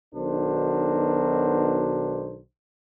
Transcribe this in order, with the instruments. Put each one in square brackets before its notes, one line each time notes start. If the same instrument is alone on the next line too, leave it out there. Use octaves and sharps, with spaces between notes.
[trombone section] B1 B2 D#3 D4 A#4 C5